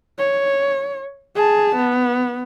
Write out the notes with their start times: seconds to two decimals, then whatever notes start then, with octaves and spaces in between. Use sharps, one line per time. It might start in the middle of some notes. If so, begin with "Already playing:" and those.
0.19 C#5
1.36 G#4 A5
1.76 B3